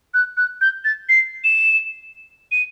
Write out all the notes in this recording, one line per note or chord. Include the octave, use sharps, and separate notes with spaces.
F#6
F#6
G6
A6
C7
E7
D#7